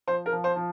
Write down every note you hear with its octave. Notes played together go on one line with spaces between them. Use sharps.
F3 C5
A#4
F3
C5
F3